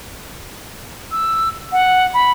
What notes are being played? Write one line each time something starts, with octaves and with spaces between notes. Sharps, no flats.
E6
F#5
B5